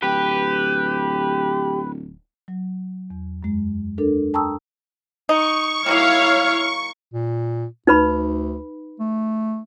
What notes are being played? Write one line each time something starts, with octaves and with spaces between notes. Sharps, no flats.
D1 G4 B4
F#3
E2
F#2 G#3
D4 A4 A#4
G5 A5 A#5 C#6 D#6 E6
D#4 C#6
D#3 F#3 A#3 E4 C#5 F5
A#2
D2 D#4 B4 B5
A3